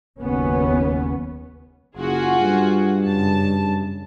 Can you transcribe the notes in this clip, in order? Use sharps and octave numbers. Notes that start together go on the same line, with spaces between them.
F#1 D#2 B3 C#4
F#1 F4 F#4 G#4
G2
F#2 C#3 A5